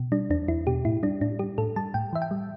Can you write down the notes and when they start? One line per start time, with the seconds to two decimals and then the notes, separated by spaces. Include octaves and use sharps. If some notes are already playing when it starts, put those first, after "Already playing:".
Already playing: B2
0.12 G3 D4
0.30 E2 D4
0.48 E2 E4
0.67 B2 G4
0.85 A2 E4
1.03 G3 D4
1.21 A2 D4
1.39 G3 G4
1.58 A2 A4
1.76 G3 A5
1.94 A2 G5
2.13 E3 E5
2.22 G5
2.31 G3